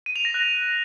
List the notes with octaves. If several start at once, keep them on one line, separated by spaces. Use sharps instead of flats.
D#7
F7
A#6
F#6